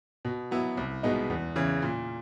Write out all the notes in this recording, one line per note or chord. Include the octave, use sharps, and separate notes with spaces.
B2
F#3 B3 E4
C2
B2 G#3 B3 D#4
E2
C#3 E3
A#2